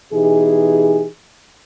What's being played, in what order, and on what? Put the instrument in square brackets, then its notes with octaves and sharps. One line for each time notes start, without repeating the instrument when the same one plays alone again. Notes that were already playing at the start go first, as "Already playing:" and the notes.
[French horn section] B2 E3 D#4 G4 G#4